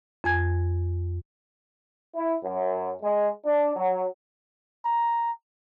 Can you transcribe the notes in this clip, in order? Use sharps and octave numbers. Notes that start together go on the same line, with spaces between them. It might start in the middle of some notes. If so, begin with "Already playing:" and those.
F2 G#5 G#6
E4
F#2
G#3
D4
F#3
A#5